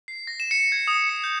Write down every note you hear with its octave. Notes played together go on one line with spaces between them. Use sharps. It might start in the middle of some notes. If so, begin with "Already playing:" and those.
C7
A#6
E7
C#7
G#6
D#6
C#7
G6